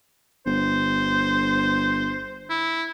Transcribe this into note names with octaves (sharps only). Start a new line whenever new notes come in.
G1 C5
E4